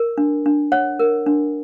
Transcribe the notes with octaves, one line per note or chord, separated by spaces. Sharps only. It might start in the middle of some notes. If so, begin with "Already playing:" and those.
Already playing: A#4
D4
D4
C#5 F#5
A#4
D4